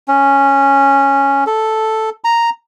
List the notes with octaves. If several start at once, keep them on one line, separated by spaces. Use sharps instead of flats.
C#4
A4
A#5